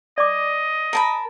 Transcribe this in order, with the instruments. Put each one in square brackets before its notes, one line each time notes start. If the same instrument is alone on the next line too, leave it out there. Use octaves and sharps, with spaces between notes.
[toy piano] D5 D6 [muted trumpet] D#5
[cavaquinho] A#4 A5 B5